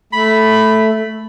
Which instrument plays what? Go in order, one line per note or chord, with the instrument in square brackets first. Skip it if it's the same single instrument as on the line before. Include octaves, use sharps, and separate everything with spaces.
[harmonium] A3 [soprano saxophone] B5